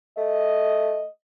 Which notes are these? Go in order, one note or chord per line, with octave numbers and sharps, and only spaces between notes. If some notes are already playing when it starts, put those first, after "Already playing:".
A3 D#5